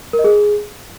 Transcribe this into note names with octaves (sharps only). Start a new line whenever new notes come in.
A#4
D#5
G#4